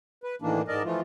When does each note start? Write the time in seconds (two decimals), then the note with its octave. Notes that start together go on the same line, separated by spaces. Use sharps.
0.24 B4
0.42 A2 D#3 E3 A#3 D4
0.68 G#2 A#4 D5 D#5 A5
0.84 E3 F3 A3 F4